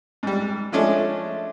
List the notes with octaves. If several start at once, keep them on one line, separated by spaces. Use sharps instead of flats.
G#2 G3
F3 G#3 A3 C#4 D4